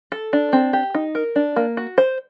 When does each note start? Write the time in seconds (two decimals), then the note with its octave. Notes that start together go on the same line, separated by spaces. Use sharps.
0.12 A4
0.33 D4
0.53 C4
0.73 G4
0.95 D#4
1.15 A#4
1.36 D4
1.56 A#3
1.77 F#4
1.98 C5